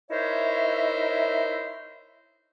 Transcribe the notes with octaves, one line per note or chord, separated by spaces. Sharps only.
D#4 E4 A#4 C5 C#5 E5